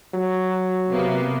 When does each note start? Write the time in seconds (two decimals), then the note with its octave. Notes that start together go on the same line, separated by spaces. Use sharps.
0.14 F#3
0.89 C3 A#3 B3